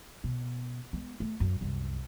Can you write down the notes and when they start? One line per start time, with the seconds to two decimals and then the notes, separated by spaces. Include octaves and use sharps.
0.24 B2
0.93 G#3 B3
1.20 A3
1.40 F#2
1.61 C2 F#2